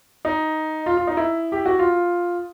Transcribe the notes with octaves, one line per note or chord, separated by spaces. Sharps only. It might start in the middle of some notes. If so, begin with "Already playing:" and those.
D#4
F4
F4
D#4
E4
G4
F#4
F4